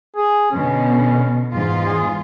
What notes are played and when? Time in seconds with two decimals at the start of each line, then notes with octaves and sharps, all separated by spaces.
0.16 G#4
0.52 B2 D3 C#4
1.52 E2 G#2 F4
1.85 G#4